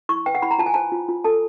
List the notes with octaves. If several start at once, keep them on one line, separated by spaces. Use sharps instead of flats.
E4 C#6
B4 G5
F#5
E4 B5
A#5
F4 A5
G#5
C5 A5
F4
F4
A4 A5